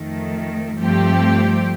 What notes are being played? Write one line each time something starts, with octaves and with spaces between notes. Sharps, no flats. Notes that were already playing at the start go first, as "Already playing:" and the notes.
Already playing: F2 D#3 A3
G2 F3 A3 C4 G4